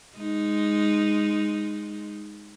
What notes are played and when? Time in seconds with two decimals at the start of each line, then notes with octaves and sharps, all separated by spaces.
0.18 G#3 D#4